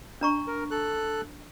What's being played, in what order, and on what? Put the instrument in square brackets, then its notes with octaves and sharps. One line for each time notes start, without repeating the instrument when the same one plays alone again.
[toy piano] D4 A#5 C#6
[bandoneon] A#4
A4 F#6